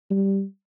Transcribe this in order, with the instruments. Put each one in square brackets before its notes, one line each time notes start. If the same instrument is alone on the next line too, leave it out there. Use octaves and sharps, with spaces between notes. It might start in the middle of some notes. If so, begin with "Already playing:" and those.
[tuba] G3